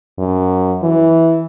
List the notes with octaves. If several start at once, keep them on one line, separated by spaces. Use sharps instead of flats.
F#2
E3